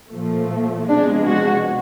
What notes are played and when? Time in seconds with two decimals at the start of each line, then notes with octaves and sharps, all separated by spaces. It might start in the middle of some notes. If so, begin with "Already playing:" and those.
0.13 A#2 F3 A3
0.88 C3 F3 G#3 B3 D4
1.27 F#4